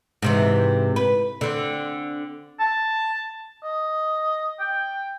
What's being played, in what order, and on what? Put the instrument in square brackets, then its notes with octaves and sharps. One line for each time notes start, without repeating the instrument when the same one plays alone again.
[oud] G#2 C3 E3
B4
D3 C4
[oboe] A5
D#5
G5